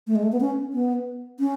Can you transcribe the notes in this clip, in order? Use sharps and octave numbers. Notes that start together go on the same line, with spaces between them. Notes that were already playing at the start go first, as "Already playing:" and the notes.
A3
G#3
A3
B3
C#4
B3
C#4